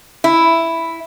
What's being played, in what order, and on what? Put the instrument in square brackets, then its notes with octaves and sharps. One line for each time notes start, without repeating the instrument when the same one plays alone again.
[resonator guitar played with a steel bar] E4